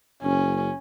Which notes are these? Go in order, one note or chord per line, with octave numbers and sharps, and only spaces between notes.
F#1 C#4